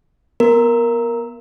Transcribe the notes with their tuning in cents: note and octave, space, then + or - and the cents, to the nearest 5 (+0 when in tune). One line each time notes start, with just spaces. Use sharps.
B3 -20 A#4 +0